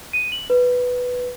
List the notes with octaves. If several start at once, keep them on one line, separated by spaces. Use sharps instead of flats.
D#7
F#7
B4